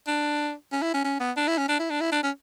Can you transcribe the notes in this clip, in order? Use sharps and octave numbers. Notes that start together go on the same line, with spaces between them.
D4
C#4
E4
C#4
C#4
B3
D4
E4
C#4
D4
E4
D4
E4
D4
C#4